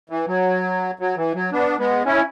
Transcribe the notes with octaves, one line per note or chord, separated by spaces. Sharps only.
E3
F#3
F#3
E3
F#3
B3 D4
G#3 B3
C#4 E4